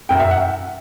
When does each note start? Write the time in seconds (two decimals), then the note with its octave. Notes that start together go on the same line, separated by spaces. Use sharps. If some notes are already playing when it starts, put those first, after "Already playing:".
0.09 F#2 G5
0.20 E5
0.31 F#5